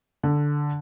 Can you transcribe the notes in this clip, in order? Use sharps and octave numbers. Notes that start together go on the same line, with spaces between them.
D3